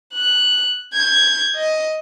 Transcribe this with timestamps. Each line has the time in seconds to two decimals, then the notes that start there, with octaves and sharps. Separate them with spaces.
0.14 F#6
0.94 G6 G#6
1.56 D#5